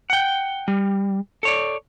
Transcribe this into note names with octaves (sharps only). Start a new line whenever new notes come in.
F#5 G5
G3
A4 C#5 D5